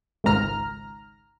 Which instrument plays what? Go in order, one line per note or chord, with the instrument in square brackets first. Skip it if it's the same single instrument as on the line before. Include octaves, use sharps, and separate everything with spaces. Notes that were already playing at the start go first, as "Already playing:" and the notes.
[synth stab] G#1 C#2 G#2 A#5 F6